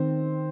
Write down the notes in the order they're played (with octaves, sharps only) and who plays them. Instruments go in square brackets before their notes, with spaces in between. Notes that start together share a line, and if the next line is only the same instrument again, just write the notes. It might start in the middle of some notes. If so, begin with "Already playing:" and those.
Already playing: [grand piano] D#3 C4 C5